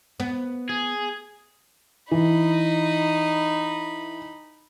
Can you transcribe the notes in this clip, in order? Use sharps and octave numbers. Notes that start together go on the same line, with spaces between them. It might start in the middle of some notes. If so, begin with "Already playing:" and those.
B3
G#4
E3 D#4 B5